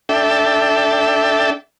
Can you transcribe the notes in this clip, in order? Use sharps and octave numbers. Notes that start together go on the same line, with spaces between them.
D4 A4 E5 G5